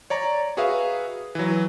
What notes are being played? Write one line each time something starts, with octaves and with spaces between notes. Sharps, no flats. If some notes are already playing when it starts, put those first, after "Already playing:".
C#5 D5 A#5
F#4 G#4 B4 E5 F5
E3 F#3